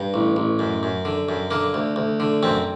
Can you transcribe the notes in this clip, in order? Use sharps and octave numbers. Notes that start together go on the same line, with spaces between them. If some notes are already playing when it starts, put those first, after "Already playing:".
Already playing: G2
A1
A1
F#2
F#2
D3
F#2
D3 A#3
D2
D2
D3
F#2 C4